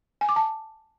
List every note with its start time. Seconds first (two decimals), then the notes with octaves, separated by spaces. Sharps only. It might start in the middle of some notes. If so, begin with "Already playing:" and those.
0.21 G#5
0.29 D6
0.36 A5